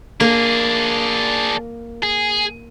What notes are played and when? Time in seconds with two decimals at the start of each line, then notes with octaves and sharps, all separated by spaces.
0.20 A#3 D4 G#4
2.03 G#4